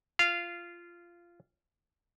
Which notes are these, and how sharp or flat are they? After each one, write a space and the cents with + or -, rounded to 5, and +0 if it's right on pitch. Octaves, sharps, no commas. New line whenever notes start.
F4 -15 F5 -15